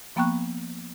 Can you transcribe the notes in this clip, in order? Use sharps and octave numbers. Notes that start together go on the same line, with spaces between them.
F3 A#3 B3 G5 C#6 F#6